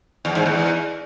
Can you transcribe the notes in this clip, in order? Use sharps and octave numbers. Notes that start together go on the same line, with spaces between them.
E2
G#2
E2